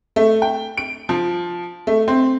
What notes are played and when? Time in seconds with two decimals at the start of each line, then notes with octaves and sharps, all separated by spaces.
0.16 A3
0.42 G5
0.77 D7
1.09 F3
1.87 A3
2.08 C4